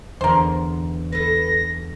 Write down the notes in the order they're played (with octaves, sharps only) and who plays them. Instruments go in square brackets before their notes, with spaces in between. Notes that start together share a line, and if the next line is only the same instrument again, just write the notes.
[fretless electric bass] E2 D3 [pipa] A#4 C5
[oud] A4 B4 [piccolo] A#6